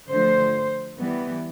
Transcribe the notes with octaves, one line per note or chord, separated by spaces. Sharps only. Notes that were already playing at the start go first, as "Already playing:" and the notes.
D3 F3 A3 C5
E3 G3 B3